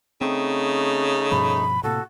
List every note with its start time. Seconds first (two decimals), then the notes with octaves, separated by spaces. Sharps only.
0.21 C#3 A3 C4 D#4
1.31 G2 B2 F3 B5
1.83 A2 C3 A#3 F#4 A4